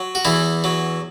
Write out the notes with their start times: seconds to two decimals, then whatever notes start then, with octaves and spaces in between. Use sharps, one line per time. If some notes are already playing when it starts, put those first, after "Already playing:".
Already playing: F#3
0.15 F#4
0.25 E2 E3 E4
0.64 F#3